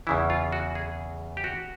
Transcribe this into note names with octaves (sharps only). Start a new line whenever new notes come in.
E2 C#3 E3 E4
F4
F#4
G#4
G4
F#4